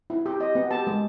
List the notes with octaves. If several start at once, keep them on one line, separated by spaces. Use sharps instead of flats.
E4
G4
G4 D#5
B3
G4 A5
G#3